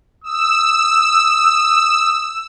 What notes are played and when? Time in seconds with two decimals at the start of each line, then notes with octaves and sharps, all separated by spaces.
0.24 D#6 E6